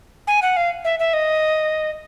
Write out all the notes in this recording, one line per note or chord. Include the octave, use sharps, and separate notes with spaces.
G#5
F#5
F5
E5
E5
D#5